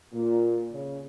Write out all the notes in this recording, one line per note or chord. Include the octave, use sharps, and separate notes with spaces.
A#2
C#3